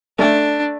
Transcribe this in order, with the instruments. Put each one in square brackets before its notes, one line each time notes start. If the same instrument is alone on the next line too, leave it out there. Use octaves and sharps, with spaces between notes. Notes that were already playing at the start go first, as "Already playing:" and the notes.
[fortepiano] A3 [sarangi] D4